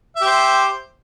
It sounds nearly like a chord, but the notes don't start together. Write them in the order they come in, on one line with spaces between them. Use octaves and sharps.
E5 G4 C5